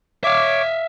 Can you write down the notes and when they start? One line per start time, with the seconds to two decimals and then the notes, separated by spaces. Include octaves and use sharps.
0.24 C#5 E5 F5 D6